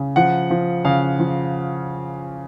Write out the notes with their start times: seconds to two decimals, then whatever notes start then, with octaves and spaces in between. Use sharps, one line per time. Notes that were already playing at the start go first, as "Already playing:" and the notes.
Already playing: C#3
0.16 F3 F#5
0.50 F3
0.85 C#3 F5
1.19 F3